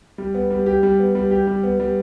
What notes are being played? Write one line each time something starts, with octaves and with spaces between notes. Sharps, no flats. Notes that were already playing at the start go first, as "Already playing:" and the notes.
G3
B3
G3
G4
G3
B3
G3
G4
G3
B3
G3